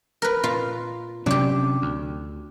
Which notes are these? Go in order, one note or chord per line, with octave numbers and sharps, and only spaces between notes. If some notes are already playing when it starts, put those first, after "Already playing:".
A#4 B4
A#2 F4
C3 F#3 C#4 D4 G4
D2